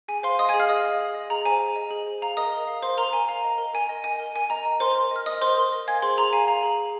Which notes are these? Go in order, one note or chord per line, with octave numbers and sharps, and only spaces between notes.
G#4 G#5
C5 F5 C6
D#5 F5 D#6
G#5 G#6
G#4
F5 F6
G#4 D#5 D#6
F5
G#4
D#5
G#4 A#5
C5 G#5
G#4
D#5
G#4
C5
F5 A#5
A#4 D#5 D#6
A#4
F5
C5 F5 C6
A#4 A#5
A#4 G#5
F5 A#5
D#5
A#4
A#4 G#5
D#5
D#5 G#5
A#4
A#4 G#5
D#5 A#5
D#5
A#4 C5 C6
A#4
D#5 F6
D#5 D#6
A#4 C5 C6
A#4
D#5
F5 G#5 G#6
G#4 C5 C6
G#4 A#5
F5 G#5
F5 A#5
G#4
G#4